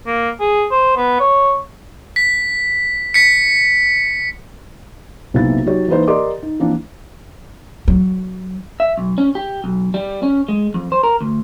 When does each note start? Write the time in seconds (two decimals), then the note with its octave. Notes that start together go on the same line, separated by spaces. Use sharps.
0.06 A#3
0.40 G#4
0.71 C5
0.97 B3
1.20 C#5
2.16 B6
3.14 B6 C#7
5.34 B1 C3 A#3 B3 E4 A6
5.65 F#3 D#4 G4 C#5
5.88 E3 A#3 D#4 B4 C5
6.08 G4 A#4 D5 D#5 C6 D6
6.43 D#4
6.60 E3 F3 A#3 C4 D4 E4
7.88 F#3
8.80 E5
8.97 B1
9.18 C#4
9.35 G4
9.64 B1
9.94 G3
10.23 C#4
10.48 G#3
10.74 F2
10.92 C5
11.03 A#4
11.21 D2